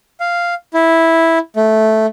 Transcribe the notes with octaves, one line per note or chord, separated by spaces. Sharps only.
F5
E4
A3